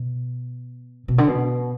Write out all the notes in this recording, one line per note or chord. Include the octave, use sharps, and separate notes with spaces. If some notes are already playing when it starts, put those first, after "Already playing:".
Already playing: B2
B2
D3
B2